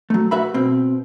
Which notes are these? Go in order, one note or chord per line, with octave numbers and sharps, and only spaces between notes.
F#3 A3
F#4 B4 E5 B5
B2 C4